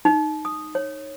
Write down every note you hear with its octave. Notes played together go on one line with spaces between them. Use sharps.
D#4
D#6
C#5